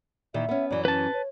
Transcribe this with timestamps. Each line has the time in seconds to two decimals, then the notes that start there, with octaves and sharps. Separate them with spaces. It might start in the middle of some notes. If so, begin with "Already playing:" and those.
0.34 A#2 D#3 E3 E5
0.49 B3 C#4
0.71 F#2 E3 D5
0.85 C#4 B4 A5
1.14 C#5